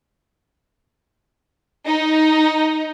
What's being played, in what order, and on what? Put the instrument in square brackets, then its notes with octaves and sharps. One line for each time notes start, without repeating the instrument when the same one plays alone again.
[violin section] D#4